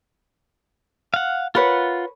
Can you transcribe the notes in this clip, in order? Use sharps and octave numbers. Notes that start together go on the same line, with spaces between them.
F5 F#5
F4 A#4 B4 C#5 F#5